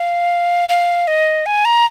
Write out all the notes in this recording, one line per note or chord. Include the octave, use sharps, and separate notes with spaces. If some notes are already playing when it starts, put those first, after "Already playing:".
Already playing: F5
F5
D#5
G#5
A#5